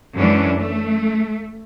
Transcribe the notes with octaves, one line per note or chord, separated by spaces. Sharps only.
F#2 E3 G#3 C#4 D4
A3